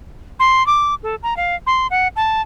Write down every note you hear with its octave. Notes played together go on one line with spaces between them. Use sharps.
C6
D6
A4
A#5
F5
C6
F#5
A5